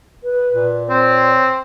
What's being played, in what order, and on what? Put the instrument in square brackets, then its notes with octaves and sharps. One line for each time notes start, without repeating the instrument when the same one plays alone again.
[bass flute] B4
[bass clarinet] A#2
[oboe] C4 [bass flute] C#5